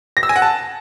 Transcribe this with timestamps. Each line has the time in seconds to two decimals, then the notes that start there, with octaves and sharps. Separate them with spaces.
0.17 A#6
0.23 E6
0.29 G#5
0.36 F#5
0.42 A5